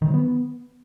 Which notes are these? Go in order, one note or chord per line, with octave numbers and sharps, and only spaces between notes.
D#3
F#3
B3